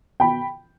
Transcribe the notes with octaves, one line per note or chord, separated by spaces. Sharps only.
B2 G5 B5